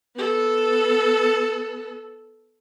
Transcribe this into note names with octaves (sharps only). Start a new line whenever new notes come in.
B3 A4